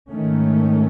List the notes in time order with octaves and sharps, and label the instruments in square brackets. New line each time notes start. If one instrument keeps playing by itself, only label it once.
[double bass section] G#2 D#3 A3 C#4